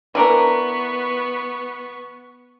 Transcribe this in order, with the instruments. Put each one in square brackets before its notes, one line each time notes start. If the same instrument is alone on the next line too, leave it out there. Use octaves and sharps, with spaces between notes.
[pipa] E3 D4 A#4 [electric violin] B3 C#6